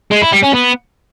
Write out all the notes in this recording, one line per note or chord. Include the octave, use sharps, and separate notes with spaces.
G#3
E4
G3
C#4
B3